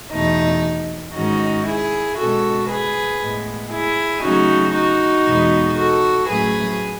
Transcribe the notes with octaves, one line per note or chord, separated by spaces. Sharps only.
E2 B2 A3 D#4
G#2 D#3 G#3 C#4 D#4 F#4
E4 G#4
B2 G#3 C#4 F#4 A4
G#4 B4
A2 G#3 B3
E4 G#4
C#3 F#3 A3 C#4 D#4 F#4
D#4 F#4
E2 B2 G#3 B3
F#4 A4
A2 F#3 A3 C#4 G#4 B4